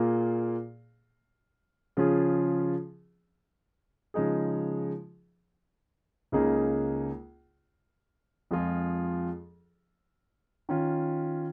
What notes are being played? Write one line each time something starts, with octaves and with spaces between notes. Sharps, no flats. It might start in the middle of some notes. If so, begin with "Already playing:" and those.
Already playing: A#2 A#3 F4 G#4
C#3 F3 C#4 F4 G#4
C#3 F3 G#3 D#4 G#4
C#2 C#3 A#3 D#4 G#4
F2 F3 G#3 F4 G#4
D#3 C#4 F4